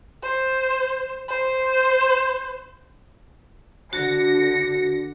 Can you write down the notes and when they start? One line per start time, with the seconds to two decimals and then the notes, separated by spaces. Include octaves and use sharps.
0.22 C5
1.28 C5
3.93 D3 F#4 A#6 C#7